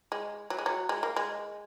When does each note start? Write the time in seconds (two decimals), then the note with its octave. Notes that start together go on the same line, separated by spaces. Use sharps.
0.12 G#3
0.50 F#3
0.59 G#3
0.66 F#3
0.89 G#3
1.03 A#3
1.16 G#3